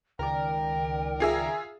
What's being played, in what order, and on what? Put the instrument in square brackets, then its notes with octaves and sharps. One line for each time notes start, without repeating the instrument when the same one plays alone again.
[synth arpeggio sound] C#2 D#3 D5 [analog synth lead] A#4 [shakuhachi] G5
[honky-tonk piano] F4 G#4 E5